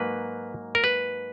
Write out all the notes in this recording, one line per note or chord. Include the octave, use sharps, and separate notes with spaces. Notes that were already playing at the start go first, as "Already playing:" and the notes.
Already playing: G#2 F#3 A#3 B4
A#4
B4